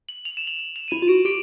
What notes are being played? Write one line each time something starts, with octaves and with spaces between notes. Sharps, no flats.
F#7
F7
E7
F#7
F#7
F7
D#7
E4 E7
F4
F#4 D7
G4 D7